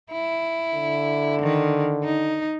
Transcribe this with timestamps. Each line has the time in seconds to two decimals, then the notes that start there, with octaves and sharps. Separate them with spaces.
0.12 E4
0.74 D3
1.42 D#3
2.04 D#4